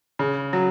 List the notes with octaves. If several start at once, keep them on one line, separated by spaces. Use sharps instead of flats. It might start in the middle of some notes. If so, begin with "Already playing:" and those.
C#3
F#3